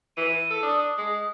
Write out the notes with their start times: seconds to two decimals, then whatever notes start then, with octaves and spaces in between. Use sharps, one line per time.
0.17 E3 D#7
0.50 A4
0.63 D4 D#6
0.78 D#6
0.98 G#3